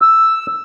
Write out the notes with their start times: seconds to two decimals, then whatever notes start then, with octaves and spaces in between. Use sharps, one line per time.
0.02 E6